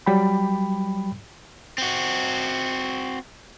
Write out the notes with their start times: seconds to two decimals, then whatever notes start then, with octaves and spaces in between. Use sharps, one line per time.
0.06 F#3 G3 G5 B5
1.78 C4 F#4